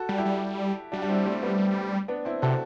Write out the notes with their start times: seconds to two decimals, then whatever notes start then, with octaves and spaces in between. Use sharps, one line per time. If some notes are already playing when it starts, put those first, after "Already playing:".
Already playing: F#4 A4
0.09 G3
0.18 E4 G4
0.25 G3
0.92 G3 D4 F#4
1.02 D4
1.09 C4 E4
1.25 A3 C4
1.43 B3 D4
2.08 B3 D4
2.25 C4 E4
2.42 C3 F#4 A4